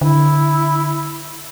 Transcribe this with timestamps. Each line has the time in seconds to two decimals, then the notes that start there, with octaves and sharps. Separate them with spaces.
0.01 D3 E4